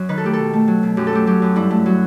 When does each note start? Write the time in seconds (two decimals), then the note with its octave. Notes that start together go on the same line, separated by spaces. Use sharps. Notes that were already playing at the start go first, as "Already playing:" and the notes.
Already playing: F#2 F#3
0.09 D#3 B4
0.18 A4
0.24 A3 G4
0.33 A4
0.39 B2
0.53 A3
0.68 F#3
0.83 B2
0.97 F#2 G4
1.07 A4
1.12 A3 G4
1.27 F#3 G4
1.42 F#2
1.56 G2 E4
1.71 A3
1.86 F#3